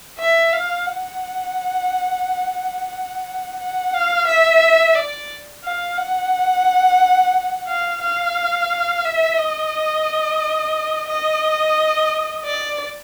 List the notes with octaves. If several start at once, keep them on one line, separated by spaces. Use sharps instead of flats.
E5
F5
F#5
F#5
F5
E5
D5
F5
F#5
F5
F5
E5
D#5
D#5
D5